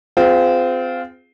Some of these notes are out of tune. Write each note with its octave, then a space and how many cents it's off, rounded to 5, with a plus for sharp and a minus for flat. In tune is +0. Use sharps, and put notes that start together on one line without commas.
C4 -25 F4 +0 G#4 +0